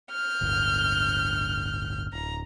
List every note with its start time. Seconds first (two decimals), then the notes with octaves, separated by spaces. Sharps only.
0.12 F6 G6
0.41 D1 G1
2.13 D1 A#5